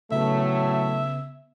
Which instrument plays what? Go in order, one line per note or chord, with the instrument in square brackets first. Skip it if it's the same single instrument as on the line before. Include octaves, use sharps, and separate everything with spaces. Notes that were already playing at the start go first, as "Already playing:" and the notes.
[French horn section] A2 F#3 A3 [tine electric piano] C#3 B3 [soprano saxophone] E5